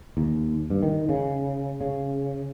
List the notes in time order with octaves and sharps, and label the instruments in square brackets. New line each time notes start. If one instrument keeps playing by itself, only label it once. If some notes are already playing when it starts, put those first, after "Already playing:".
[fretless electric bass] D#2
G2
D#3
C#3
C#3